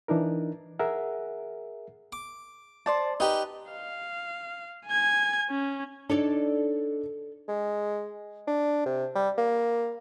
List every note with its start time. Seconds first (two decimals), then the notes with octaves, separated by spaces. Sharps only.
0.08 E3 D4 D#4 A#4
0.79 G#4 A#4 E5 F#5
2.13 D6
2.86 C5 D5 A5
3.20 D#4 G4 B4
3.72 F5
4.87 G#5 G#6
5.50 C#4
6.10 D4 D#4 A4 C#5 D5
7.48 G#3
8.47 D4
8.86 C3
9.15 G3
9.38 A#3